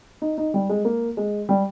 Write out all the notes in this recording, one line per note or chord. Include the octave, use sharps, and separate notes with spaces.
D#4
D#4
G3
G#3
A#3
G#3
G3